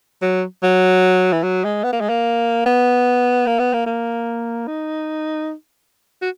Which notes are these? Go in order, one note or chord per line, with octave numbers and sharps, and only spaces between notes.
F#3
F#3
E3
F#3
G#3
B3
A#3
G#3
A#3
B3
A#3
B3
A#3
A#3
D#4
F#4